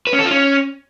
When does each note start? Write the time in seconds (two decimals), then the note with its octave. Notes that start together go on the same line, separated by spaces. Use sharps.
0.07 B4
0.13 C#4
0.19 A4
0.25 F4
0.31 C#4